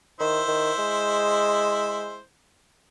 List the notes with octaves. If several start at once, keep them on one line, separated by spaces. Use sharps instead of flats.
D#3 E4 C5
D#3
G#3